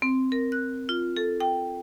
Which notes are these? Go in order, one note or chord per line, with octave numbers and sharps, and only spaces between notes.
C4
A#4
F#6
F4
A4
G5